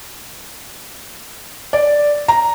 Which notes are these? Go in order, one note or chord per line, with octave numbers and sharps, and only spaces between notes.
D5
A#5